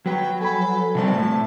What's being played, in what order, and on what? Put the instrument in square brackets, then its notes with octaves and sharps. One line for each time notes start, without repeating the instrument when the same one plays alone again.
[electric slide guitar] F#3 [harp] F#4 B4 [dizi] G5
[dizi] A4 [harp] G#5 B5
[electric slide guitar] C3 F#3 G3 [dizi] A5
[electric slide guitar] A2